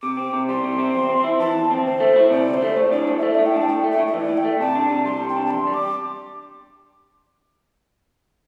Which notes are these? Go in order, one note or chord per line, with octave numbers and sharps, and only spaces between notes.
C3 D6
C4
C3
G3 C6
C3
C4
E2
C4
E4
E3 A5
E2
C4
D2 C5
A3
E4
C3 D5
D2
C5
A3
A2 D5
D4 D5
A2 C5
E5
A3 D5
A2 E5
G5
D4 A5
A2 G5
A3
E5
A2
E5
E3 D5
A2
G5
A3
C3 A5
D4
C3
G3 C6
C3
G5
D4
A5
E2 C6
G3
D6